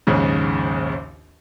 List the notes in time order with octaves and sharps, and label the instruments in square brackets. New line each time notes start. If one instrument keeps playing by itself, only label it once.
[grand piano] A#1 D#2 G#2 C#3